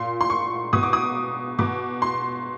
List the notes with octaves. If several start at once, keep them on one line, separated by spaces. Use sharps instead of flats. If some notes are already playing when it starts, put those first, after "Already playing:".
Already playing: A#2 C6
C6
C#6
B2 D#6
D6
D#6
B2 D6
C6